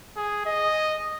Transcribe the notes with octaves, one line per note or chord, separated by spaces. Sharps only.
G#4
D#5